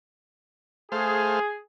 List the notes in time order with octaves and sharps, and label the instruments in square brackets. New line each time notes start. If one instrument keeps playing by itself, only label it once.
[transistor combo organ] A3 C5 F5 [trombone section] G#4